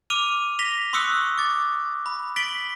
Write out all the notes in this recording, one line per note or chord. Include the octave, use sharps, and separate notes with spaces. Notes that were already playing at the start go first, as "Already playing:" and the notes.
D6 F6 D#7 F7
A#6 B6 F7 G7
C6 C#6 D#6 E6 F#6 C#7
D6 A6
B5
A6 B6 D7 F#7 G7